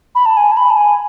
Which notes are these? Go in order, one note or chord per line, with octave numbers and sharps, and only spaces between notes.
B5
A5
G#5
A5
B5
A5
G#5